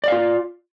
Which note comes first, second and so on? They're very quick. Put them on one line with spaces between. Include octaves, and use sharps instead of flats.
D5 F5 F4